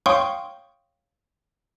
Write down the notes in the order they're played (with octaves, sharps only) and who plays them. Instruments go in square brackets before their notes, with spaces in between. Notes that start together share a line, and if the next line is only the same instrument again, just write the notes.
[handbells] C#5 F5 G5 C6 C#6 D#6